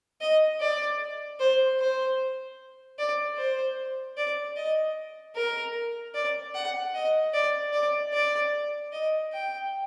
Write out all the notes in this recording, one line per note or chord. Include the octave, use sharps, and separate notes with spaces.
D#5
D5
C5
C5
D5
C5
D5
D#5
A#4
D5
F#5
D#5
D5
D5
D5
D#5
G5